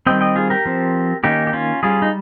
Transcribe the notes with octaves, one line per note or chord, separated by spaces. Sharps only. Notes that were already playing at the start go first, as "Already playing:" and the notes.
D#3 G3 C4 D#5 G5
D#5 G5
F4 G#4
G4 A#4
F3 C4
D#3 A#3 C#4 D#4 G4
G4
C#4 F4
G3 C#4 F4 G#4
D#4